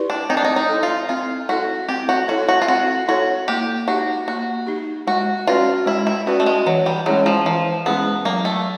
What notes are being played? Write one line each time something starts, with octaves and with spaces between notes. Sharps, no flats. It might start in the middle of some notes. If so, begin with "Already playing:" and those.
Already playing: E4 G4 B4 D5
D4
C4 D#4
D4
D#4
D#4
E4 A4
F4
C4 F4
E4 F#4 A4
C4 G4
F#4
E4 F#4 A4 C#5
F#4
F4
C4 F#4
E4 F#4 A4 C#5
A#3 G4
D#4 F#4 G4
A#3 F#4
D#4 G4
G#3 F#4
C#4 F4 F#4 B4 D5
G#3 E4
E4
B3 C#4 F#4 B4 D5
A3
G#3
E3 F#3
G3
F#3 G#3 C#4 E4 G#4
F3
E3 F3
G#3 B3 C#4 E4 G#4
F#3 A#3
A3